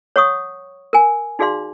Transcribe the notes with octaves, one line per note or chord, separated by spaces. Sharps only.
C#5 F#5 C#6 D#6
A#4 G#5
D#4 F#4 G#4 D5 F5 C6